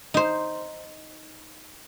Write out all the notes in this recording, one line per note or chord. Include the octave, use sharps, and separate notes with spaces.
D#4 C5